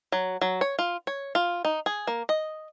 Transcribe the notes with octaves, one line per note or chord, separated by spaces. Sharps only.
F#3
F#3
C#5
F4
C#5
F4
D#4
G#4
A#3
D#5